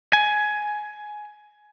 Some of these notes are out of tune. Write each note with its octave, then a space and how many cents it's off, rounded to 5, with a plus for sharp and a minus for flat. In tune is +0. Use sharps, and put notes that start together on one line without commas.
G#5 +15